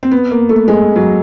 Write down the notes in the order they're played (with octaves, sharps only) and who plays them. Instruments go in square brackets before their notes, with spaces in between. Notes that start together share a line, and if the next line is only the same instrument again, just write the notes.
[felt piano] C4
B3
A#3
A3
G#3
F#3